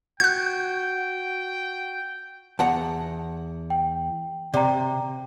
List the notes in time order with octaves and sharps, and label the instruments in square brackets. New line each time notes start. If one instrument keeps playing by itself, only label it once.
[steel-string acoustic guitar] F#4 [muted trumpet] G5 [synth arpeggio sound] F#6 G6
[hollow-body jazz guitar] E2 F#5 A#5 [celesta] A5
[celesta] G5
[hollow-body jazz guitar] C3 [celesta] D5 G5 A#5